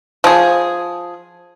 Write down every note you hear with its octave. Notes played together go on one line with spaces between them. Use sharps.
F3 G#4